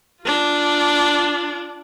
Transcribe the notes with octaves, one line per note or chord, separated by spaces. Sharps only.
D4 F4